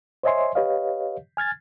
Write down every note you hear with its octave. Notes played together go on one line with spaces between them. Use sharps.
C5 C#5 D#5 E5 G#5 C6
G4 B4 C#5 D#5 F5
G#5 F6 G#6 A6